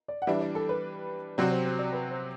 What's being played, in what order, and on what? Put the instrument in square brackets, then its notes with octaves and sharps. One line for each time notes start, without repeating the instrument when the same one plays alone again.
[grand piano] D5
F#5
[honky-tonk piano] E3 G3 D4 [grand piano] E5
[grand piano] D5
A4
B4
[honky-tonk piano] C3 F#3 C4 F#4 [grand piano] D5
[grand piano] C5
C5
D5
B4
C5